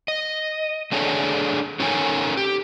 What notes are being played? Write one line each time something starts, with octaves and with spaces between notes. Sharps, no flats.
D#5
A3 D4 G#4 A4 C#5
C#4 D#4 A4 A#4 C#5 G#5
G4